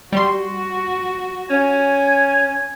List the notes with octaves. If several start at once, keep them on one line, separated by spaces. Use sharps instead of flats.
G3 F#4 C6
C#4 G#5